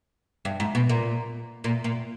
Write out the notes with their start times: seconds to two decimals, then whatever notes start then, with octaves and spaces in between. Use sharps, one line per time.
0.45 G2
0.60 G#2
0.75 B2
0.89 A#2
1.64 A#2
1.84 A#2